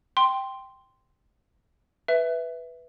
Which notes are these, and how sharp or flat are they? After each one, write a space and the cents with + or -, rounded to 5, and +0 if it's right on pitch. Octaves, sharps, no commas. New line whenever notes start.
G5 +0 C6 +0
B4 +0 E5 +0